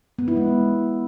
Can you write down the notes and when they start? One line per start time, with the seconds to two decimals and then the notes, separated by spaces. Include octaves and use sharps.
0.19 B3
0.28 E4
0.37 G#3